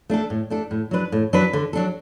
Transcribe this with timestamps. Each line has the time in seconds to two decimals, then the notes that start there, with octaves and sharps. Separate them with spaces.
0.10 A3 D4 A4
0.30 A2
0.50 A3 D4 A4
0.71 A2
0.91 F#3 D4 B4
1.12 A2
1.33 F#3 D4 B4
1.53 D3
1.73 F#3 D4 A4